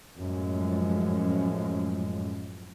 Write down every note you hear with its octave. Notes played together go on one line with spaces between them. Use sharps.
F#2 A2 F3 G#3